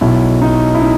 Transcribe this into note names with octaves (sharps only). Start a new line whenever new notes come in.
B1 B2 F#3 E4
D#4
E4
D#4